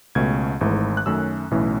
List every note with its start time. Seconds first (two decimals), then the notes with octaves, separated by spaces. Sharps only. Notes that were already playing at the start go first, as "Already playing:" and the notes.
0.15 C#2 B2 A3 C#4 G#6
0.61 G#1 G#2 E3 A3
0.97 F#6
1.06 F#2 D#3 A3 C#4 E6
1.51 B1 A2 E3 A3 C#4